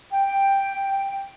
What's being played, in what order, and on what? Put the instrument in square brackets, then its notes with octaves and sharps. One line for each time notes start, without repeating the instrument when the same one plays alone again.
[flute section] G5